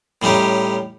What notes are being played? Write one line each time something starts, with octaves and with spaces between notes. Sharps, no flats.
A2 G3 C#4 D#4 G4